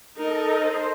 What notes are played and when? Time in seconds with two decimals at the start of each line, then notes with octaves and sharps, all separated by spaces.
0.17 D#4 A4 A#4 D#5
0.58 C5